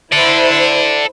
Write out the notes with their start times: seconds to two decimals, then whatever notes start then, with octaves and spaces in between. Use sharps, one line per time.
0.12 E4 A4 C5 D5